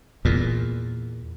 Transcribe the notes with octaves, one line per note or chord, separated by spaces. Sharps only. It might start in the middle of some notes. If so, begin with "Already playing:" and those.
E2 A#2